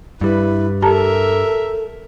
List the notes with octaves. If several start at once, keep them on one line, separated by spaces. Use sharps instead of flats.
G2 G3 E4 B4
G4 A4 A#4 E5 A5 A#5